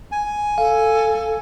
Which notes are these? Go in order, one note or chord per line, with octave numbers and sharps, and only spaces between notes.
G#5
A4 F5